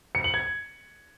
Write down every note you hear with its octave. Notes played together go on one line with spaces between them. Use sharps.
C#7
F#7
G#6